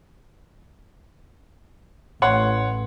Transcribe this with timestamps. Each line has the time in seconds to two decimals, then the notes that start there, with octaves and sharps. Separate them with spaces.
2.22 A1 C#5 F#5 C6